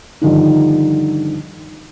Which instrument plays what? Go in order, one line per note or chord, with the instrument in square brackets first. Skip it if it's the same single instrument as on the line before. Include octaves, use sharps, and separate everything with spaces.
[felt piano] G2 D3 D#3 F3 D4 D#4